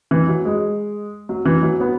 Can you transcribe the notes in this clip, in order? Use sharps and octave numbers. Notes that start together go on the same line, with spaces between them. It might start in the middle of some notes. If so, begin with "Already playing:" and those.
E3
F#3
G#3
F#3
E3
F#3
B3